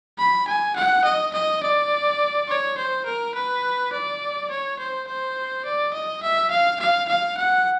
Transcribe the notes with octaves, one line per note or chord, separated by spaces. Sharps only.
B5
G#5
F#5
D#5
D#5
D5
C#5
C5
A#4
B4
D5
C#5
C5
C5
D5
D#5
E5
F5
F5
F5
F#5